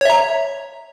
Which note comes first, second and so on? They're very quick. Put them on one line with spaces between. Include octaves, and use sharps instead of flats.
C#5 E5 A#5